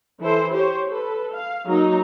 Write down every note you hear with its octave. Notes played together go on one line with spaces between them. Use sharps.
E3 E4 A4 C5
G4 C5 C#5
A4 B4
F5
F#3 A#3 D#4 A#5